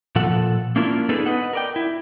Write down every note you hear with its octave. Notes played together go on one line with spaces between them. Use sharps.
A#2 F3 A4 F#5
A#3 C#4 D4 E4 F4 A#4
B3 D4 D#4 G#4 A4 B4
B4 D#5 F#5
A#4 D5 G5
E4